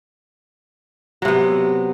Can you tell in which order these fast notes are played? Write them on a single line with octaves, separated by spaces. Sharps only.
F#3 C3 B3